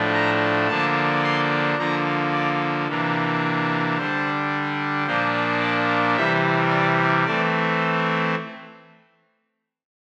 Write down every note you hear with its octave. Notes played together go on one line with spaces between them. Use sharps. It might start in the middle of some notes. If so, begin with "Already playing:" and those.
Already playing: A2 F3 A3 D4
A#5
D3 F3 A#3 D4 A5
C6
D3 F3 A#3 A#5
D5
C3 E3 A#3 D4
D3 G3 D4 C5
A#2 F3 A#3 D4 C5
D5
C3 E3 G3 E5
D5
E3 A3 C4 D5